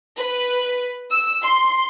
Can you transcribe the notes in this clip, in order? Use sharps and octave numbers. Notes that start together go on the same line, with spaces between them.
B4
E6
C6